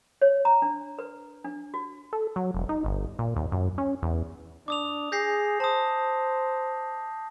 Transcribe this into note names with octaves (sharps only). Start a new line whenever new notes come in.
C#5
A#5
D4
B4
D4
F#4
A4
F#3
E1
D#4
G1
A#2
D#2
F#2
C#4
E2
D4 D6 D#6 F7
G#4 G6 A#6 C7
C5 A5 D#6